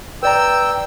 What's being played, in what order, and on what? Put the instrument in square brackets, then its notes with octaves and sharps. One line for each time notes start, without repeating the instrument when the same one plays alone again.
[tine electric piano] B4 D5 A#5 [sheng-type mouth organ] G5 E6